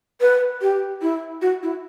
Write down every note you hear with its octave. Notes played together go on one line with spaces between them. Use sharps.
B4
G4
E4
F#4
E4